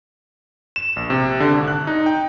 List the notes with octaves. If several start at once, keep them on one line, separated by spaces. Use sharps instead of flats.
E7
A#1
C3
D3
G#1
F#6
D#4
G5